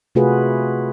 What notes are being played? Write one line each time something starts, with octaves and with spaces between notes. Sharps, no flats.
C3 A3 F4 F#4 G#4 B4